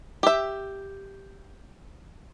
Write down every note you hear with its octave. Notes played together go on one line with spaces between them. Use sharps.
G4 E5